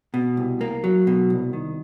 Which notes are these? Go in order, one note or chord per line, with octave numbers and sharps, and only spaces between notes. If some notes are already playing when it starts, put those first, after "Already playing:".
B2
C2
A#3
F#3
B2
C2
D#3